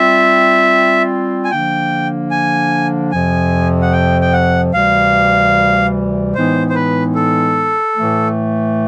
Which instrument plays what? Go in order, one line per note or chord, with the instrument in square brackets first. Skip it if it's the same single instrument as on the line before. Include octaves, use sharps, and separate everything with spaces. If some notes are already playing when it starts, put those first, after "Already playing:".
Already playing: [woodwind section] G3 C4 F4 [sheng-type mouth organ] E5
[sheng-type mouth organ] G#5
[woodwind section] D3 F3 A#3 D4 [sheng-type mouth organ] G5
[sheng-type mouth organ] G#5
[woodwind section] F2 C3 F3 [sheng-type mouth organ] G#5
[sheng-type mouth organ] F#5
G5
G5
F#5
[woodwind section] D2 C3 E3 G3 [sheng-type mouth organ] F5
[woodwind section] A2 E3 G#3 B3 D#4 [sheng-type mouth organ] C5
[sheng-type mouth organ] C5
B4
A4
[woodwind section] A2 E3 A3